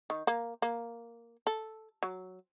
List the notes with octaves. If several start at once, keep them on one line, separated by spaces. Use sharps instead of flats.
D#3
A#3
A#3
A4
F#3